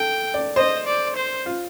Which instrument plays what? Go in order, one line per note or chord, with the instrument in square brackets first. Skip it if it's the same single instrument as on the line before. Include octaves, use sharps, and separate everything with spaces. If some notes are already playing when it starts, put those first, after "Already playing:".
Already playing: [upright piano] A4 [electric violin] G5
[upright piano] D5
[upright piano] C5 [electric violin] D#5
[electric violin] D5
C5
[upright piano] F4